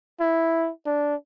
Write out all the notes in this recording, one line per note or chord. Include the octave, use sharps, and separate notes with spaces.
E4
D4